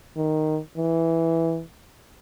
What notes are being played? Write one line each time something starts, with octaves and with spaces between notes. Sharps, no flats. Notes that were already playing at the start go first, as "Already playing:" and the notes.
D#3
E3